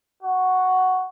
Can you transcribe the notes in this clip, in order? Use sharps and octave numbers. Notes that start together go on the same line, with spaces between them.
F#4